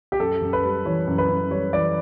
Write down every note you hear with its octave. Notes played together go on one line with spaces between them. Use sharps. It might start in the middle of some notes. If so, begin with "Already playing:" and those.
G4
F#2 A4
F#2
B4
G3
E3 C#5
F#2
B4
F#2
G3 C#5
E3 D5